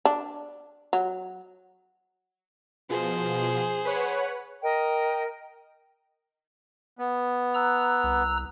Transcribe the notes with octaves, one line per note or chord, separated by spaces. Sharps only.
D4
F#3
B2 F3 G#4 C5
B4 C#5 F#5
A#4 D#5 G5
B3
A#5 E6 F#6
C2